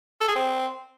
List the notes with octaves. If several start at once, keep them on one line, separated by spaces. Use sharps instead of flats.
A4
G#4
C4